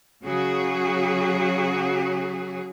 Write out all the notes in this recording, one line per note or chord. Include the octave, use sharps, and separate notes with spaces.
C#3 F#3 F#4 G#4